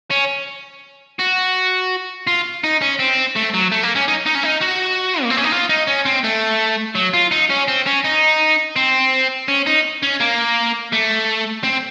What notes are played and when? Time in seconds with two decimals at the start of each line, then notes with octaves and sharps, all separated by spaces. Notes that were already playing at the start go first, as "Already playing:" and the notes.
0.11 C#4
1.19 F#4
2.27 F4
2.64 D#4
2.82 C#4
2.99 C4
3.36 A3
3.54 F#3
3.72 A3
3.83 A#3
3.96 C#4
4.08 D#4
4.26 D#4
4.35 C#4
4.43 D#4
4.61 F#4
5.22 A#3
5.30 C4
5.37 C#4
5.44 D#4
5.52 F4
5.69 D#4
5.87 C#4
6.05 C4
6.24 A3
6.95 F#3
7.14 F4
7.31 D#4
7.50 C#4
7.68 C4
7.86 C#4
8.04 D#4
8.76 C4
9.48 C#4
9.66 D#4
10.02 C#4
10.20 A#3
10.92 A3
11.64 C4